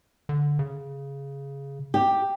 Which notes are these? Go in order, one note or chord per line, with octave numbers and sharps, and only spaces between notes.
D3
C#3
G4